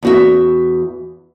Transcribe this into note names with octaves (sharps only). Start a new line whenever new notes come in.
E2 F#4 E5